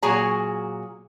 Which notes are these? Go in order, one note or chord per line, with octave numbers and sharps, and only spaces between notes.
A#2 F#3 F#4 G#4 G#5 A#5